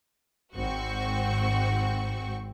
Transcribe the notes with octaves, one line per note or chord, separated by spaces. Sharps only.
G#1 G#2 C4 F#4 C#6